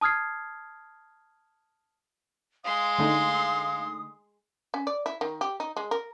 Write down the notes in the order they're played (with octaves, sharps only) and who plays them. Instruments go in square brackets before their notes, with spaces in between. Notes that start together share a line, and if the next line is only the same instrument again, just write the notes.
[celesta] A5 D#6 F6 G#6 C7
[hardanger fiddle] G#3 C6 [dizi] F5 [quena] D#6
[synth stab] D3 A3 D#4
[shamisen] C#4
D5
E4
D#3
G4
D#4
G#3
A#4